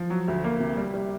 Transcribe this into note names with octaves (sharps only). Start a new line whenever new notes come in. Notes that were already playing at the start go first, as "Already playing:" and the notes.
Already playing: F3
F#3
D2
A#3
C3
G3
G3